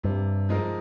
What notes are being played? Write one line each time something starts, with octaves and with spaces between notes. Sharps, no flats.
G2 C3
F3 G#3 D#4 A#4